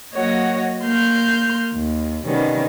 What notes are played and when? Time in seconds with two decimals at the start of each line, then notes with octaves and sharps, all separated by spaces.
0.13 F#3 A#3 F#4 C#5 D#5 F#5
0.82 A#3 C6 F6 G6
1.73 D#2
2.25 C3 D#3 G3 B3 C#4